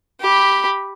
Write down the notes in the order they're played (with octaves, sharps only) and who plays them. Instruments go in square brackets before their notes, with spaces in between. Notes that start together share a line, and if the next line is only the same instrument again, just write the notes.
[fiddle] G4 B5